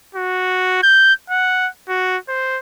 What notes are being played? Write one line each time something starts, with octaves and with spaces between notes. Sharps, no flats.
F#4
G6
F#5
F#4
C5